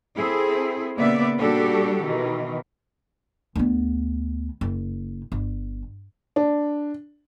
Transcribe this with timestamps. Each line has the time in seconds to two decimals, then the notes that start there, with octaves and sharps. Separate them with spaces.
0.16 C4 E4 G#4 A4
0.97 A#2 C#3 A#3 B3 D5 E5
1.38 A#2 G3 D4 F#4 G4 A4
2.02 B2 D#3 E3
3.56 D2 B3
4.61 F#1
5.32 G1
6.36 D4